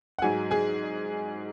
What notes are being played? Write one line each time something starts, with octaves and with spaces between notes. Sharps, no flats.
F#5
G#2 F#3 G#4 G#5
G#4 G#5